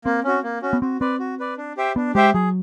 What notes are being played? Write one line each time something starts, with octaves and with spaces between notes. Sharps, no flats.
A#3 C4
C#4 F#4
A#3
C#4 F#4
B3
C4 F#4
C4 B4 D5
F#4
B4 D5
D4
G4 C5 E5 G5
B3 D4
G#3 G4 C5 E5 G5
F#3 G#4